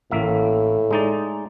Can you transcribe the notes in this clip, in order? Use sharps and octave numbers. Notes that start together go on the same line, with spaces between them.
A1 A2 A#3 E5
G#3 D#4 D5